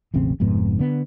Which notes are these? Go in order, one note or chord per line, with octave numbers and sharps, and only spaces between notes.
E1 A1 C#3 C4
F1 F2 G#2 B3
D3 B3